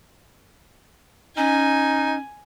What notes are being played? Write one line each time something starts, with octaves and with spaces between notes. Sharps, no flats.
C#4 D#4 G#5